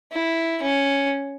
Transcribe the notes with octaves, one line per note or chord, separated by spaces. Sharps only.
E4
C#4